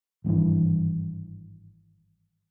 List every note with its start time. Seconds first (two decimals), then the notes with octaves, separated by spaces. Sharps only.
0.24 G#1 G2 B2 E3